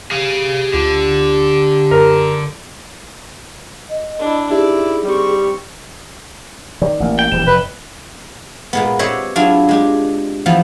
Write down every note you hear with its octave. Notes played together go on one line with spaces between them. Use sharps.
G4 G#4 F5
D2 D3 F4 A#6
F#2 A#4
D#5
D4 E4
D#4 E4 G4 G#4 D5
G3 C4 C#6
D#3 D5
A1 A#3
G5
D#1 E3 G3 E7
F1 B4
A#2 G#3 B3
C4 G4 C#5 D#5 E5 F#5
F#3 D4 E4 F4 G#4
G#3 G4 G#4
E3 F3 B3